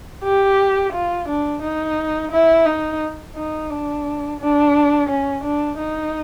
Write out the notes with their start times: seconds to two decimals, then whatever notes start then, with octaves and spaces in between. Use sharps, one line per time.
0.24 G4
0.93 F4
1.28 D4
1.62 D#4
2.32 E4
2.66 D#4
3.36 D#4
3.70 D4
4.40 D4
5.09 C#4
5.44 D4
5.78 D#4